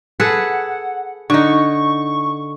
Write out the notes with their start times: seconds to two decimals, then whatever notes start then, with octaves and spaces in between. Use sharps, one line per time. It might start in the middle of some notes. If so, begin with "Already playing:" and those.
0.20 G#4 A4 B4 F#5
1.30 D3 D#4 C#6